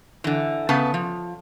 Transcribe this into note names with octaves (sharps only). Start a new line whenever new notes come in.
D3 E3
C#3 B3 A5
F3